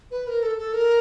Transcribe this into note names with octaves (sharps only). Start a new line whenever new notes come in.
B4
A#4
A4
A4
A#4